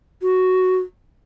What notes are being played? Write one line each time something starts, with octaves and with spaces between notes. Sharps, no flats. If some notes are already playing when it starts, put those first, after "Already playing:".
F#4